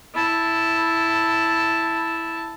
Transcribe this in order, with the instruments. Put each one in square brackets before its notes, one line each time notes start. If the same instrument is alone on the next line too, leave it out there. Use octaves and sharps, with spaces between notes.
[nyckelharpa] E4 A5